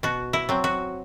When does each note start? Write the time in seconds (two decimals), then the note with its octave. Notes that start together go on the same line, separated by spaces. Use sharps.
0.03 B2 F#4
0.33 E4
0.49 F#3 C4
0.64 F#4